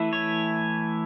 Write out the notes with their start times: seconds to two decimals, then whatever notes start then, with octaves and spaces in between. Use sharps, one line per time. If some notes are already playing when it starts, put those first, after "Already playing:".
Already playing: E3 A3 E4
0.13 C#5